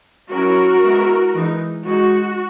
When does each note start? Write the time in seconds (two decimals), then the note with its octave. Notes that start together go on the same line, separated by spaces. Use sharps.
0.30 F#3 C#4 E4 F#4 A#4
0.82 G#3 B3 E4
1.35 E3 G#3 D#4
1.85 G#3 D#4 F#4